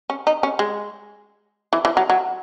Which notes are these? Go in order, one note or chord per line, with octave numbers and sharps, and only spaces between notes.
C#4
D#4
C#4
G#3
E3
E3
F#3
F#3